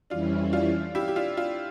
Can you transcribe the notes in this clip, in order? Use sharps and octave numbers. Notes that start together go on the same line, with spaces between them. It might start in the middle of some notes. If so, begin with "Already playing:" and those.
F2 E3 G3 C#4 D4 E4 F4
D4 F4
E4 G4
G4
D4 F4
D4 F4